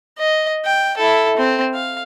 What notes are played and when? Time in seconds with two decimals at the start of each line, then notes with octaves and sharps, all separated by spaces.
0.19 D#5
0.66 G5
0.97 E4 A4
1.37 C4
1.74 F5